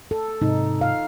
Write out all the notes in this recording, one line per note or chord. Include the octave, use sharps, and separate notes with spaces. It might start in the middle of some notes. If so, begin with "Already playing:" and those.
A4
G#2 C3 D#4
F5